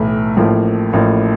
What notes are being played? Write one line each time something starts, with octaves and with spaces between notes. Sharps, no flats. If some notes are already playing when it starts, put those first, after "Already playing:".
Already playing: B1 A2 E3
A1 A2 F3 A#3
A1 A2 F3 A#3